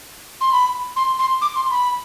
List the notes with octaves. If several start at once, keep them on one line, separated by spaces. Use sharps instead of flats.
C6
B5
C6
C6
D6
C6
B5